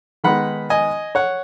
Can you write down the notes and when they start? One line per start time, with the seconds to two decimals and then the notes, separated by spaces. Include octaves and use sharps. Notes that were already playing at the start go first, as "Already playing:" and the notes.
0.24 D#3 G#3 B3 D#4 F#5 B5
0.70 D#5 G#5
1.15 C#5 F#5